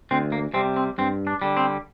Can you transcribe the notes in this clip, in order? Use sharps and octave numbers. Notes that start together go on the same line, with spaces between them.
D2 C4
A#3
C3 G3 C4
C4
G2 C4
D4
D3 G3
C4